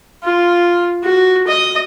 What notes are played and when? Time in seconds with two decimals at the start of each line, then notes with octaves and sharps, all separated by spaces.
0.23 F4
1.03 F#4
1.47 D#5